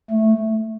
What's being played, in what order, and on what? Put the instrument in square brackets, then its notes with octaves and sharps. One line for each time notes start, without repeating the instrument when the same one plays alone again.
[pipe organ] A3